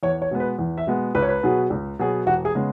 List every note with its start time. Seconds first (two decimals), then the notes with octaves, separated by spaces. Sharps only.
0.03 E2 C#5
0.22 C#5
0.31 B2 G#3 B3
0.40 B4
0.59 E2
0.78 E5
0.87 B2 G#3 B3
1.15 C#2 B4
1.22 C#5
1.29 B4
1.43 B2 F#3 B3 G#4
1.70 C#2
1.99 B2 F#3 B3 G#4
2.26 E1 F#4
2.45 G#4
2.55 C#3 G#3 B3